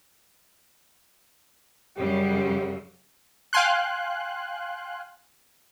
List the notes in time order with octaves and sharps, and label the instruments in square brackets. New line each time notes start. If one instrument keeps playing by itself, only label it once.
[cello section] F#2 C#3 G3 [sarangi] G4
[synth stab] F5 G5 G#5 C6 F#6